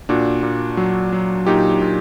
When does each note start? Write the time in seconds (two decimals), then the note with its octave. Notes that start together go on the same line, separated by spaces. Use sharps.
0.09 A#2 D4 F#4
0.43 A#2
0.77 F#3
1.13 F#3
1.46 A#2 D#4 G4
1.82 A#2